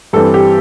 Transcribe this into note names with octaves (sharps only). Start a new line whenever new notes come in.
G2 E3 G3 C4 A4
G4